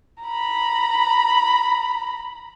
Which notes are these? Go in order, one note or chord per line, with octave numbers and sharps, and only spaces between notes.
A#5 B5